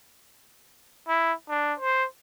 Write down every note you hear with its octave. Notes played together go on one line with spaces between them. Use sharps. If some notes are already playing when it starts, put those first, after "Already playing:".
E4
D4
C5